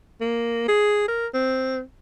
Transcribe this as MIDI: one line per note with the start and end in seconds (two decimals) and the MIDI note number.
0.21 0.65 58
0.68 1.06 68
1.08 1.27 70
1.34 1.81 60